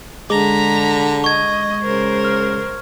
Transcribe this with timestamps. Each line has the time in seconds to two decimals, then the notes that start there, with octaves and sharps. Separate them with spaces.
0.30 D3 G#3 A#5 D6 B6
1.24 D#5 C#6 G#6
1.83 C#3 A#4 C5
2.25 F6